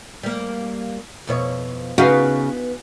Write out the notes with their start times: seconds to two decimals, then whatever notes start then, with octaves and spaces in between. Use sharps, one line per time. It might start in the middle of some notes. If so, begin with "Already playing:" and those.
0.23 G3 A#3
1.27 F2 B2 C#5
1.98 C#3 B3 D#4 F#4 B4 F5